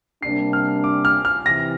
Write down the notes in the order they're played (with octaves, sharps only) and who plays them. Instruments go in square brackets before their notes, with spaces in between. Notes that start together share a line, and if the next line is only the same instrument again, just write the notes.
[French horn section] C3 G3 A#3 D4 [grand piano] C7
[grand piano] F6
D6
F6
F6
[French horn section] C3 E3 [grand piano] A#6